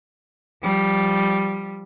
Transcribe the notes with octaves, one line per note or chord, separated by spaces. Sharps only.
F3 G3